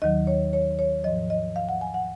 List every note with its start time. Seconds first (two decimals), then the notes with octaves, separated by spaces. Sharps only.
0.02 D#2 D#3 F#3 D#5
0.27 C#5
0.53 C#5
0.79 C#5
1.04 G#2 F3 D#5
1.30 D#5
1.56 F5
1.69 F#5
1.81 G#5
1.94 F#5